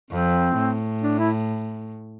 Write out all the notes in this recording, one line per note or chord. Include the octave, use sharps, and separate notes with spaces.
F2 C4
A2
D4
E4